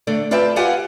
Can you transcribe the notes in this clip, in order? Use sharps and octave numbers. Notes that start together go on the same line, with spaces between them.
D3 A3 D5
F4 B4 D5 E5 G5 A5
F4 G4 F5 F#5 G#5